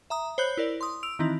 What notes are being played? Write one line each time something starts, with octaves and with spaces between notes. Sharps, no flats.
E5 A#5 D#6
C5 C#5 B5 F#6 G6 F#7
E4 A#4 D5
C6 D#6
E6 D7 F7
D#3 E3 C4 D#4 E4